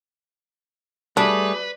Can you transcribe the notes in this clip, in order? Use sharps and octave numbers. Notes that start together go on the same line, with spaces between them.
G3 A3 D4 G#4 B4